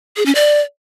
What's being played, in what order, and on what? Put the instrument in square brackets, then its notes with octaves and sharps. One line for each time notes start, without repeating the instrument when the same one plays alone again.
[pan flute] G#4
C#4
D5